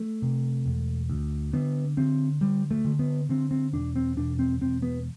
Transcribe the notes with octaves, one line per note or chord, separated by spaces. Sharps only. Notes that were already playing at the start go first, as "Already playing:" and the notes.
Already playing: A3
C3
E1
D2
D3 B3
D3 C4
D3 G3
A3
D3
B3
D3 C4
C4
E1 D4
C4
E1 D4
C4
E1 C4
B3